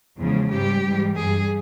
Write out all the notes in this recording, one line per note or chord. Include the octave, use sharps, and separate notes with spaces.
E2 C#3 F3 G#3
G#2 G3 G4
G#2 E3 G3
G2 G3 G#4